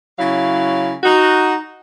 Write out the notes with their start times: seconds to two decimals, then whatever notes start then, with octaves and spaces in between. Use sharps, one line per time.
0.19 C#3 F#3 E4 F5
1.03 D#4 F#4